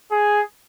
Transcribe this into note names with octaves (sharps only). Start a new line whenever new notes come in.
G#4